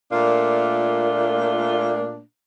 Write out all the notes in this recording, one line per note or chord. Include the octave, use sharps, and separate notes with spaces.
A#2 A3 A#3 D4 F4